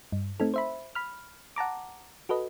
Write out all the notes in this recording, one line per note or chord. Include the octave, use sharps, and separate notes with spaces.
G2
A3 C4 D#4 A4
C5 E5 B5
B5 F6
F#5 A5 A#5 D6
F#4 A4 B4 D#5